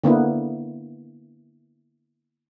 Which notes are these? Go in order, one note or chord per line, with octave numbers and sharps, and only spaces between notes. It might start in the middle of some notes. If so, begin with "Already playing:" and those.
D3 A#3 B3 E4